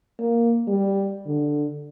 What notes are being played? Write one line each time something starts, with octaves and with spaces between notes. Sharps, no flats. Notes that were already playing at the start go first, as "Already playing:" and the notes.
A#3
G3
D3